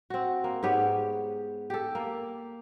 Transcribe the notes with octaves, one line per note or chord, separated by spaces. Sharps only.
C4 F#4
A#3
G#2 B3 G4 C#5
G4 A4
A#3